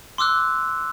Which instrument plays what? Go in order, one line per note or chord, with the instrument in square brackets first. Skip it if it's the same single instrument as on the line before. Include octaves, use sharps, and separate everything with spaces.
[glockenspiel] C6 D6 E6 F#6